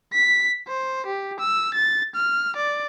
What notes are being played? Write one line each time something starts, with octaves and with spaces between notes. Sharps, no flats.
B6
C5
G4
E6
A6
F6
D5